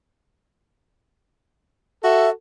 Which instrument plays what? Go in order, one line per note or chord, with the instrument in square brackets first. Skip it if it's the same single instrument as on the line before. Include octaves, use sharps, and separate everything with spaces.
[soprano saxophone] F#4 [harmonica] A4 [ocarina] E5